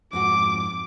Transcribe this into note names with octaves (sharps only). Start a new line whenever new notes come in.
F2 G#2 F#4 D6